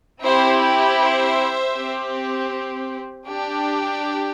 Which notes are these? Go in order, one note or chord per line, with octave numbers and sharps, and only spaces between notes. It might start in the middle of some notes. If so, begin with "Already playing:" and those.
C4 E4 G4 C5
C5 E5
C4 G4
D4 G4